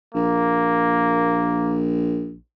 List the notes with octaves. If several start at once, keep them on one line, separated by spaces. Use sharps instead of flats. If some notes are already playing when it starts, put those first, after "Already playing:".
A#1 A#3